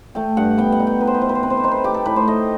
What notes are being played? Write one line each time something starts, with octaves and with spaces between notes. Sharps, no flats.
A3 G5
G2 F#5
B3 G5
F#5
D#4
G5
D#4 B4
C5
B4
B2 C5
B4
C5
C4 B4
C5
B4
D#4 C5
B4
D#4 G4
A4
A2 B4
C5
A3 D#5